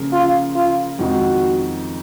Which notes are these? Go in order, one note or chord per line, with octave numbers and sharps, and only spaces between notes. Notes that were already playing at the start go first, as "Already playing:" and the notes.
Already playing: C#3 F3 A#3
F4
F4
F2 D#3 G#3 D#4 F#4